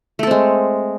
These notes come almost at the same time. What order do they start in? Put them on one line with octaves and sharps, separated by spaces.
A3 A4 C4 G#3